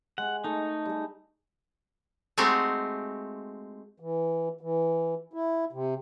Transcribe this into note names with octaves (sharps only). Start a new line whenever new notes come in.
G#3 G#4 F#5
A3 D#4 A4
G3 G#4
G#3 A3 C4 D#4 F#4 G4
E3
E3
E4
C3